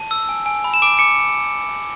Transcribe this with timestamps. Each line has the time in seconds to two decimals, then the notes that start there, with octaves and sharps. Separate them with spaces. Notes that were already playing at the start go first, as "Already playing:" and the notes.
Already playing: A5
0.11 E6
0.29 G#5
0.46 G#5
0.64 B5
0.74 E7
0.82 D6 D7
0.99 D6 C#7